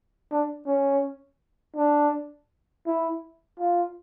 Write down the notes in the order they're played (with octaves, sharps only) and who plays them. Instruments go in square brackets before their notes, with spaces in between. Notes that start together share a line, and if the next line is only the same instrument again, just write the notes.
[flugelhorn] D4
C#4
D4
E4
F4